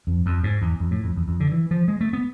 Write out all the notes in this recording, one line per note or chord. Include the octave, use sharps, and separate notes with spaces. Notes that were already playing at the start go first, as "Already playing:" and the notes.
F2
F2
G#2
E2
F2
A2
F2
E2
F2
D3
E3
F3
G#3
A3
B3